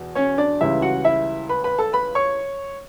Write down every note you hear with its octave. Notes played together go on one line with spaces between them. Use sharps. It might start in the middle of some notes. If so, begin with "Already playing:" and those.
Already playing: E2 B2
C#4 C#5
D4 D5
C#2 C#3 E3 G3 E4 E5
F#4 F#5
E4 E5
B4 B5
B4 B5
A4 A5
B4 B5
C#5 C#6